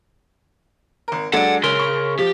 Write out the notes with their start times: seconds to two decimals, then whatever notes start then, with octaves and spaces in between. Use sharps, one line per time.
1.08 G#1 A#4
1.33 F#3 G#3 D4 A4 D5 F#5
1.64 C#3 A#4 C6
1.79 C#6
2.19 F3 G4